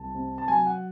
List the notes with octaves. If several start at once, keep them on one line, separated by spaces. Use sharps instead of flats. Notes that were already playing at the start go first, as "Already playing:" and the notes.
Already playing: C2 A5
C3
A5
F#3 G#5
F#5